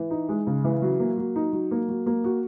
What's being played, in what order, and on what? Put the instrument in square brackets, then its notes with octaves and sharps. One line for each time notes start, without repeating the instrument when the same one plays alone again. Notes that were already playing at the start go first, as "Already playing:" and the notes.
Already playing: [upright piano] E3
D#4
G#3
C#3
E3
F#3
A#3
F#3
D#4
F#3
A#3
F#3
A#3
F#4